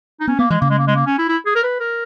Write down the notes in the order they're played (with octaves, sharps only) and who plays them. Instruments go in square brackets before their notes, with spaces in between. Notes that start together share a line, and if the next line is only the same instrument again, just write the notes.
[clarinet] D#4
[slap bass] B3 [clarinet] C#4
[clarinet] A#3 [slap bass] B3
[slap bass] E3 [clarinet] G#3
[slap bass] C#3 [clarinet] A#3
[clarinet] G#3
A#3
G#3
A#3
C#4
E4
E4
G#4
A#4
B4
A#4